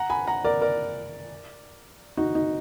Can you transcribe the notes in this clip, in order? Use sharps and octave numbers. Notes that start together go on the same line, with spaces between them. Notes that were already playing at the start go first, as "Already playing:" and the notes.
Already playing: F#5 A#5
G#5 B5
F#5 A#5
A#4 D5
A#4 D5
D#4 F#4
D#4